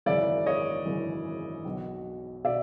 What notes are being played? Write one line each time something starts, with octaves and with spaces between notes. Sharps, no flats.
G#1 F#2 C#3 E3 D5 E5
C#5 D#5
G#1 F#2 C#3 E3
B1 B2
B2 D5 E5